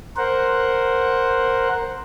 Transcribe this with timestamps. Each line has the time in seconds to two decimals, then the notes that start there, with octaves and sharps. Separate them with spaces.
0.17 A#4 C5 F#5